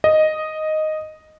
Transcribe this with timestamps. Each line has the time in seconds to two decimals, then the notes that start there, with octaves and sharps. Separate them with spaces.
0.04 D#5